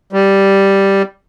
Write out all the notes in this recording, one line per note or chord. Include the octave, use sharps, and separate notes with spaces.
G3